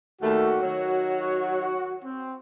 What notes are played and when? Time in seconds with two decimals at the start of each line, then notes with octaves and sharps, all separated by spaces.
0.22 D#2 G3 A3 F#4
0.62 D#3 F#3 C#5
2.05 C4